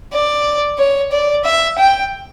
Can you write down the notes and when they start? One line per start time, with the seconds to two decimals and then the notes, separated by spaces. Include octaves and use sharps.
0.13 D5
0.78 C#5
1.12 D5
1.44 E5
1.78 G5